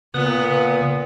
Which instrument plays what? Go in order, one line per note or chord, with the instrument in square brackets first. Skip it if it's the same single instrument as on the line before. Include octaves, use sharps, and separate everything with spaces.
[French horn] A#2 [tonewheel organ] C#3 B4 D#6 [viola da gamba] B3